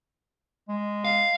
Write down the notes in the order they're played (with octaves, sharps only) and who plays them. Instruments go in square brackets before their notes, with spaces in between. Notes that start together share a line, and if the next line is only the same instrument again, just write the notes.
[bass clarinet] G#3
[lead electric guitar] F5